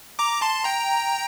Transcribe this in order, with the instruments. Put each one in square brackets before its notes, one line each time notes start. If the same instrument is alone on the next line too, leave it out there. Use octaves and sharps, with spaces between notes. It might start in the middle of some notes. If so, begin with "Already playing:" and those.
[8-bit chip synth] A#5 D6
A5 C6
G5 A#5